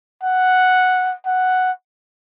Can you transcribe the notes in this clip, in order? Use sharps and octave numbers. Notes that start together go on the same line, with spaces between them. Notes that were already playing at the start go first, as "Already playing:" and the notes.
F#5
F#5